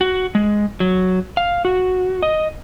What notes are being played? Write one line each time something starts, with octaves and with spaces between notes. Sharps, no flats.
F#4
G#3
F#3
F5
F#4
D#5